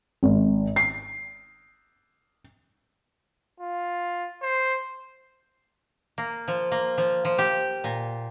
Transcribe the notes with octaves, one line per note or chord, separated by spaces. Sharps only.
G#1
C7
F4
C5
A#3
F3
A#3
F3
F3
G4
A#2